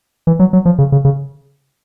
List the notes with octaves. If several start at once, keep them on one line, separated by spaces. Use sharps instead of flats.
E3
F#3
F#3
F3
C#3
C#3
C#3